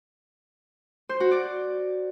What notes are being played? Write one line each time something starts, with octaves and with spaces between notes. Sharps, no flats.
C5
F#4
D5